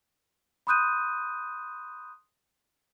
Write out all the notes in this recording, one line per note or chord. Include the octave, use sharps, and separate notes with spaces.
B5 C6 D#6 F#6 G6 D#7